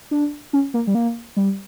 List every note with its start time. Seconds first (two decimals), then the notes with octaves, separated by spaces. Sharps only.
0.11 D4
0.53 C#4
0.74 A#3
0.87 G3
0.95 A#3
1.36 G3